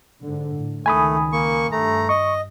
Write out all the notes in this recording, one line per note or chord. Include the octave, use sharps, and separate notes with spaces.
G#2 D3
A2
C#2 D#3 A3 G#5 B5 D#6
A#3 C#6
G2 A3 A#5
D#5 C#6